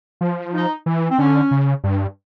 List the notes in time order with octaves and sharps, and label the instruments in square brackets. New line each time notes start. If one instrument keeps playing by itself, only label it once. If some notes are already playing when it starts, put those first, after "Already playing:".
[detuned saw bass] F3
[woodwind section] D#4
[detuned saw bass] E3
[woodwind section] C4
[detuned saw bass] D3 [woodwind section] C#4
[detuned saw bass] C#3
G2